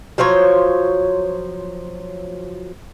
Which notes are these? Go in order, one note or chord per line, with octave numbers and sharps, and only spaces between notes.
F3 F#3 C5 C#5